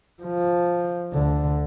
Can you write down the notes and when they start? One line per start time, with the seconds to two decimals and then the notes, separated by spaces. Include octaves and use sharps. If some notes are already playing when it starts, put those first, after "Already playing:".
0.22 F3
1.13 D2 D3